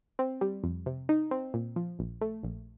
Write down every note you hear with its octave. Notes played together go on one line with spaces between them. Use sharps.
C4
G3
F2
C3
D#4
C4
A#2
F3
A#1
A3
A#1